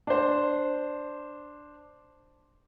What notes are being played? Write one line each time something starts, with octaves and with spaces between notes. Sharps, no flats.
D4 C5